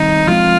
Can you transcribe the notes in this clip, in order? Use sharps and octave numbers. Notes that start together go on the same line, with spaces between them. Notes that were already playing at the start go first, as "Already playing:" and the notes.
Already playing: D#3 G3 C4 D#4
F3 G#3 C4 F4